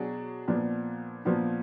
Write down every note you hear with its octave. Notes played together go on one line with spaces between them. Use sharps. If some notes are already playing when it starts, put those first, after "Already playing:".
Already playing: B2 F#3 D4 G#4
A#2 F3 B3 D4
A#2 F3 B3 D4